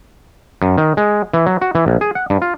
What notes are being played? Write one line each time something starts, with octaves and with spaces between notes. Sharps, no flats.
F#2
D#3
G#3
E3
F#3
F#4
E3
A#1
G#4
F#5
G2
F4